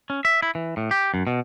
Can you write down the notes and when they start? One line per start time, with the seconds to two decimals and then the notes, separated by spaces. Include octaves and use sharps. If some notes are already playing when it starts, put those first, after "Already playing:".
0.10 C#4
0.25 E5
0.43 E4
0.55 E3
0.77 A2
0.91 G4
1.14 F#2
1.27 B2